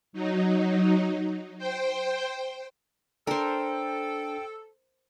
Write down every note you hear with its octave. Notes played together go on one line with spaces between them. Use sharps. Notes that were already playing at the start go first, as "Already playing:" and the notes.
F#3 D#4
C5 G5
D4 A4 A#4 C5 G5